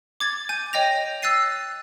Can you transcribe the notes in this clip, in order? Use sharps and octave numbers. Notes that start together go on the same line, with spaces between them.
D6 G#6 A6
G#5 G6 D#7
C#5 D#5 G5 A#6 F7
E6 F#6 A6 C7 D#7